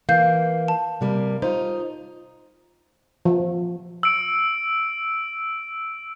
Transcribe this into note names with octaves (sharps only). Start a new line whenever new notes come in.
E3 A#3 F5 G6 C7
A5
C3 G3 A#3
D#4 F4 C5
F3
E6 D7